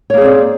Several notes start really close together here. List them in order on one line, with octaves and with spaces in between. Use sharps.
C#5 A#3 G#4 C4 D5